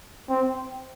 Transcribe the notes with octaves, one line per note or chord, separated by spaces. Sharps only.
C4